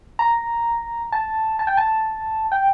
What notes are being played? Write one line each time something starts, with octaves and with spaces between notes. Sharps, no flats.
A#5
A5
A5
G5
A5
G5